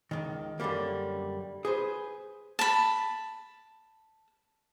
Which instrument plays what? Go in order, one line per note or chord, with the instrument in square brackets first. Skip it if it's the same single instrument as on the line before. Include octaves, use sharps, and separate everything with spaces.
[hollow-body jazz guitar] C#2 F#2 D#3
F#2 D3 F3 G3 A#3
G#4 B4 C5
[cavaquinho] A5 B5